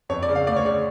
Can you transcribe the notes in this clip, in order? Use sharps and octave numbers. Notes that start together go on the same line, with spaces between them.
F2 C#5
D5
C#3
F5
D2 D5
C#5
C#3 D5